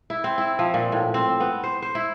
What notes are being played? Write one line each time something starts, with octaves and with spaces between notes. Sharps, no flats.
E4
C4
E4
F3
A#2
A2
C4
B3
C5
C5
E4